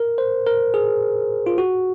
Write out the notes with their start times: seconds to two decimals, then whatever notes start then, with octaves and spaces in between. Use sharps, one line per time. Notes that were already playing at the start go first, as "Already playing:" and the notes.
Already playing: A#4
0.18 C5
0.47 A#4
0.74 G#4
1.46 F4
1.58 F#4